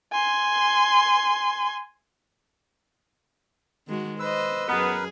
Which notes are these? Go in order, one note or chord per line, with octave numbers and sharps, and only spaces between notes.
G#5 C6
D#3 G#3 F#4
B4 C5 D#5 E6
F#2 B3 G#4 A#4 B4